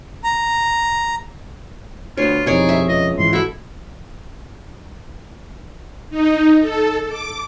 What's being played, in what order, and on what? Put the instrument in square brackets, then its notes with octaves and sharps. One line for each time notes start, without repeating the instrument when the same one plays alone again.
[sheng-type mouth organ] A#5
[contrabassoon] D2 [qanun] B3 C#5 [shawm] F4
[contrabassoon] C2 [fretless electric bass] F2 B2 [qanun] D#4 C#5 D5 [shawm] G#4
[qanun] E5
[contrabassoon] C#2 [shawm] D#5
[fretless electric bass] G#2 E3 [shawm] C6
[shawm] E4 [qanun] F#4 A4
[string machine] D#4
A4
D6